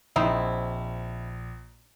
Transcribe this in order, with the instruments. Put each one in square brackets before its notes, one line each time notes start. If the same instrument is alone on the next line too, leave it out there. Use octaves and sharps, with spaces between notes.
[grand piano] A#1 [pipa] C4 D#4 E4